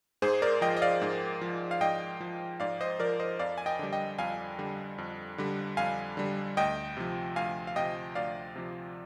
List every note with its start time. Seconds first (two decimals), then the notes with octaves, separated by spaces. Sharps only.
0.22 G#2 G#4 C5
0.42 A#4 D5
0.61 F3 D#5 G5
0.77 D#5
0.82 D5 F5
1.02 G#2
1.41 F3
1.71 F5
1.81 G#2 D#5 G5
2.20 F3
2.60 G#2 D5 F5
2.80 C5 D#5
3.00 F3 A#4 D5
3.20 C5 D#5
3.39 F2 D5 F5
3.58 G#5
3.66 D#5 G5
3.79 D3 G3
3.92 D#5 G5
4.18 F2 F5 G#5
4.58 D3 G3
4.98 F2
5.38 D3 G3
5.77 F2 F5 G#5
6.17 D3 G3
6.57 D2 D#5 G5
6.97 C3 F3
7.36 D2 F5 G#5
7.67 F5
7.76 C3 F3 D#5 G5
8.15 D2 D5 F5
8.56 C3 F3